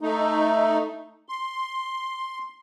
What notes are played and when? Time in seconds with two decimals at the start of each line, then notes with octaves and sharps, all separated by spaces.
0.01 A3 D#4
1.29 C6